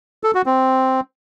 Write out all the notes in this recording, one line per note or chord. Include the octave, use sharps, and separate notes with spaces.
A4
F#4
C4